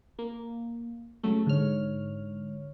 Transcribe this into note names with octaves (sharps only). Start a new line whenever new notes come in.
A#3
C#3 F#3 A3
G#2 D3 C#5 F6